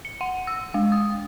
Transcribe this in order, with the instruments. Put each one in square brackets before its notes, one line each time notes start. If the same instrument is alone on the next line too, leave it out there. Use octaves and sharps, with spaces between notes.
[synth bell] C#7
F#5
E6
G#3
D#6